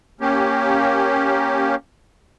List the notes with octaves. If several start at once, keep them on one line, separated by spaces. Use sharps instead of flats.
A#3 C#4 G4